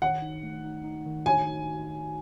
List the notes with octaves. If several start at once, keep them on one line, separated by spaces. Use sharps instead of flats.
D#3 F#5
D#4
A3
D#4
D#4
D#3
F#4 G#5
D#4
F#4
F#4